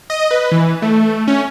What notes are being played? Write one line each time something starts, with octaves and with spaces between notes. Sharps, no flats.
D#5
B4
E3
A3
C#4